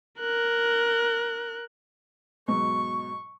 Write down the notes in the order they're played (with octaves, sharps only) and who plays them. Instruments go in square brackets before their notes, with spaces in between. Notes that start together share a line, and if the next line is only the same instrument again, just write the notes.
[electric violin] A#4 F#6
[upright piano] G#2 B2 F#3 [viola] C#6